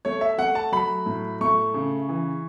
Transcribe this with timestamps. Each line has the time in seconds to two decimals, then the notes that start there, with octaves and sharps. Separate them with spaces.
0.05 A3 C#5
0.21 E5
0.38 A3 F#5
0.55 A5
0.72 F#3 B5
1.06 A2
1.41 A3 C#6
1.74 C#3
2.09 E3